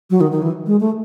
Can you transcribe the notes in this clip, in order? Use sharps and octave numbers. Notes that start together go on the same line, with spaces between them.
F#3
D#3
D#3
E3
G#3
A3